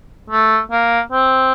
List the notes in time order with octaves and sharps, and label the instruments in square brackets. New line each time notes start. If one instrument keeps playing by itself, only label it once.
[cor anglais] A3
A#3
C4